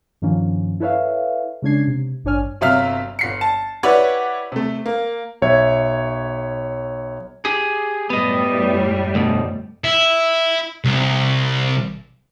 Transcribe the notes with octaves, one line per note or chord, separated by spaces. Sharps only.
G2 D#3 F3 A#3 C#4
E4 A4 B4 C#5 E5 F5
C#3 G#3 C#4 D4 G#6 C7
C3
A1 G2 D4 C#5 G#5 F6
G1 C3 F#3 E5 F5 F6
G1 C7 C#7
A5
E4 G4 B4 C#5 D5 F#5
C3 A3
A#3
B1 C#5 E5 G#6
G4 G#4
F#2 A2 G3 B3 D#5
D2 B2
E4
C2